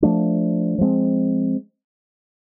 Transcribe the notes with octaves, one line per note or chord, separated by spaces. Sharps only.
F3 A3 D4
F3 G#3 C4